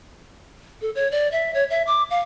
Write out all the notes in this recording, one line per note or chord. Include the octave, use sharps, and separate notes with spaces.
A4
C#5
D5
E5
C#5
E5
D6
F5